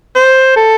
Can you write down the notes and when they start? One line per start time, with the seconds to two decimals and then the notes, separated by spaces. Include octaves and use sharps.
0.16 C5
0.56 A4